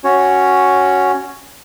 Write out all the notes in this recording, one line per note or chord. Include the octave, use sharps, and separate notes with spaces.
C#4 F#4 C#5